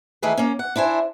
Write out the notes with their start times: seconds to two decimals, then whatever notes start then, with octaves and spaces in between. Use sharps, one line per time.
0.22 D#3 E3 A3 G#4 B4
0.37 A#3 C#4
0.59 F#5
0.76 D4 E4 C5 G#5